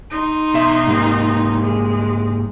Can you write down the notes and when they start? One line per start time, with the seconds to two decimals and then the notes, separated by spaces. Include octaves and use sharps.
0.11 D#4 C6
0.54 B2 E5
0.87 G#2 G3 A#3
1.63 G#3